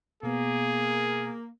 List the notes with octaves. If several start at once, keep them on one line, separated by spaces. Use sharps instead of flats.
B2 A#3 B3 G#4